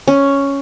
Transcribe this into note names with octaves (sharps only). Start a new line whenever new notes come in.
C#4